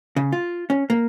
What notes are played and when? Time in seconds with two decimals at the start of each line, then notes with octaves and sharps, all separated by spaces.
0.16 C#3
0.32 F4
0.70 C#4
0.90 A#3